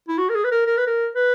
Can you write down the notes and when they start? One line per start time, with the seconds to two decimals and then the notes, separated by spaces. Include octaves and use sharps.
0.08 E4
0.18 F#4
0.29 A#4
0.35 G#4
0.44 B4
0.52 A#4
0.67 A#4
0.78 B4
0.87 A#4
1.16 B4